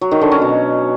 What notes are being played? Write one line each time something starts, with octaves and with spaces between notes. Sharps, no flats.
F#3
D#3
D3
C#4
B2